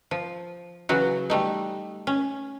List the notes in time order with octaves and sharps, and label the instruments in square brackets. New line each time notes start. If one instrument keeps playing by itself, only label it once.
[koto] F3
C#3 E3 F#3 F#4
G3 A3 D#4
C#4